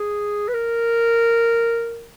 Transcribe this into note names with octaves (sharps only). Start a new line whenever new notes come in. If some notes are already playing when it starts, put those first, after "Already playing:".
Already playing: G#4
B4
A#4